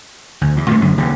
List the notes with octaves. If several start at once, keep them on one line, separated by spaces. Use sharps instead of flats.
D2
E2
A#2 D#3 A3
F#2 D3
E1 D#2 C#3